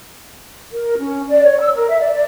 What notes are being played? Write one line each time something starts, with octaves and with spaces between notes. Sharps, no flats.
A#4
C#4
D5
C#5
E6
A#4
E5
D5
D5